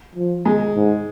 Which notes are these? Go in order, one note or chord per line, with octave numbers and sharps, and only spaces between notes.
F3
G#3
G#2